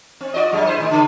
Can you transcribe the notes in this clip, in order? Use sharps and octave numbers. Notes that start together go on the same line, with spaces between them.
C4
F4 D5 D#5
F#2 G3 G#3
E4 B4 C5
A2 D#3
C#3